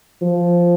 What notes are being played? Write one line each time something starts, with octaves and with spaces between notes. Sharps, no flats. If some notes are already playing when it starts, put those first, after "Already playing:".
F3